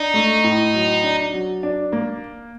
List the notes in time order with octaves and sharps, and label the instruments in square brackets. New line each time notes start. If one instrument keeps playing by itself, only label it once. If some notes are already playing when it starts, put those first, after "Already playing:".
Already playing: [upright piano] D4 [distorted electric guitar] D#4
[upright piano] A3
A2
F#3
D4
F#3
D4
A#3